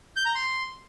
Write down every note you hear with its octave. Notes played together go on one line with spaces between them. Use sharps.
G6
A#5
C6